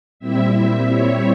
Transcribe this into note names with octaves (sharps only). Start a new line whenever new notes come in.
A#2 G3 C4 E4 E5
C#5